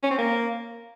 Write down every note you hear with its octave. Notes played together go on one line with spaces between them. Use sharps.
C#4
C4
A#3